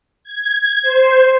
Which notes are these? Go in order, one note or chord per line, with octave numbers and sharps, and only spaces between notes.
G#6
C5